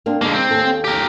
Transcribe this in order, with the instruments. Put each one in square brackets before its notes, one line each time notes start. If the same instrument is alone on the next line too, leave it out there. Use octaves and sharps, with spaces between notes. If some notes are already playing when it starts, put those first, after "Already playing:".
[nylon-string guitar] A#3 C4 D4
[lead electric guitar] D3 A#3 [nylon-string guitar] G#3 D#4
[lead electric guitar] C4
[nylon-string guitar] D#2 C#4 A4
[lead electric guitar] G4 A#4